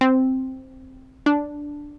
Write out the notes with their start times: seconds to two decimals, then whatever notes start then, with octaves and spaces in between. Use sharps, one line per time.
0.01 C4
1.26 D4